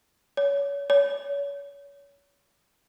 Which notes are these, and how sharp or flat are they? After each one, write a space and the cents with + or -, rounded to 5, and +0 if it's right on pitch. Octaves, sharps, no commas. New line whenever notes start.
C#5 +25
C#5 +30